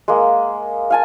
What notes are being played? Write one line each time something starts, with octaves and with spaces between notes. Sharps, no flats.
G#3 A#3
F5 G#5 A5